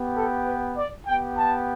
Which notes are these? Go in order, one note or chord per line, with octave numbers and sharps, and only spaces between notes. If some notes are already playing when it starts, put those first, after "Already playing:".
Already playing: B3 G4
A4
B4
D5
B3 G4 G5
A5